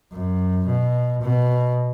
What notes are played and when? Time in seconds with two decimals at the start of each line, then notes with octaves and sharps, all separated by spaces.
0.12 F#2
0.67 B2
1.22 B2